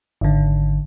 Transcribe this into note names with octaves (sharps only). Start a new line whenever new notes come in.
G#1 D3